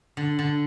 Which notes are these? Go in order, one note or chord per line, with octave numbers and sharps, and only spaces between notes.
D3
D3